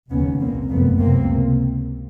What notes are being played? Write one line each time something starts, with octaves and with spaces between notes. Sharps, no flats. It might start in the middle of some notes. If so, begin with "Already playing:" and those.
F1 D#2 C#3 B3 C#4
C2 A#2 A#3 C4
F#1 F2 C3 A3 B3
C#2 C3 A#3 C4